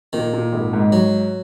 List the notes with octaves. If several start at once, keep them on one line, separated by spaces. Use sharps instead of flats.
A#2 D#3
A#2
G#1
G#2
F#3